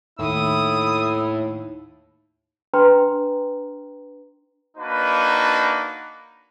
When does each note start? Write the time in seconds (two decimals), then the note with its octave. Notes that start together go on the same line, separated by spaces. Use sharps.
0.19 D#2 A2 E4 D#6
2.73 D4 B4 G5 A#5 C6
4.77 A#3 D4 D#4 F#4 B4